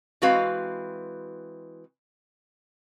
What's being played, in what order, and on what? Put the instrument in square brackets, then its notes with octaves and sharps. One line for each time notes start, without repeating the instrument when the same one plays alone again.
[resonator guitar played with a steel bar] E3 G#3 C4 F#4 B4 F5